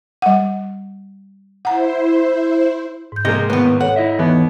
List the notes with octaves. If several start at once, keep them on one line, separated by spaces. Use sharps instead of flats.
G3 F#5
E4 C5 F#5 A#5
G#2 G6
C3 G#3 A#3 D#5
A2 D#3 B3 B4
A4 C#5 F#5
E4 D#5 E5
D#2 E3 B3